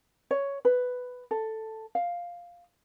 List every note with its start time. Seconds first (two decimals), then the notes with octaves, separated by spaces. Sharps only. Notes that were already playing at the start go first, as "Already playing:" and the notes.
0.31 C#5
0.65 B4
1.31 A4
1.95 F5